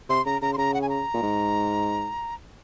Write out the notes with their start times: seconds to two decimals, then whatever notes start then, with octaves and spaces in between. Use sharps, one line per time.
0.09 C3 C6
0.25 C#3 A#5
0.42 C#3 A#5
0.53 C6
0.58 C#3 A#5
0.74 F#5
0.82 G#5
0.89 A#5
1.14 A#2
1.23 G#2